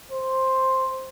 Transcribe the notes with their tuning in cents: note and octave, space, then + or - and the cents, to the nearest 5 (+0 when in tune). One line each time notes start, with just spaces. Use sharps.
C5 +5